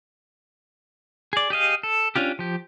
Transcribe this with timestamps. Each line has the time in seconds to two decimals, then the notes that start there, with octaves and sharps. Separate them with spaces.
1.33 G#4 D5
1.50 G4 G#4 D#5 F5
1.83 A4
2.16 C#4 D4 F4 G4
2.39 F3 G4